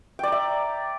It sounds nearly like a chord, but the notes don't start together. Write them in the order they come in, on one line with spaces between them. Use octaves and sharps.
G5 D5 A#5 E5